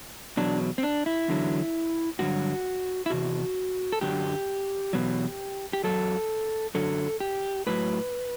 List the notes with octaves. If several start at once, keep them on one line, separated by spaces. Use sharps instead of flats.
E2 B2 F#3 D4
C4
D4
E4
E2 D3 F#3
G2 D3 F#3 F#4
E4
E2 C3 F#4
A4
F#2 D3 F#3 G4
E2 B2 F#3
G4
F#2 F#3 A4
F#2 D3 F#3 A4
G4
A2 F#3 B4